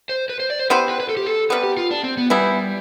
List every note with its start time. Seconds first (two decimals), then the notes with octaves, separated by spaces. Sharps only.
0.09 C5
0.29 B4
0.40 C5
0.50 D5
0.59 C5
0.70 B3 E4 G4 B4 C5
0.89 B4
1.00 B4
1.09 A4
1.17 G4
1.26 A4
1.50 C3 G3 B3 B4
1.63 G4
1.77 F4
1.91 D4
2.04 C4
2.17 B3
2.30 E3 G3 B3 E4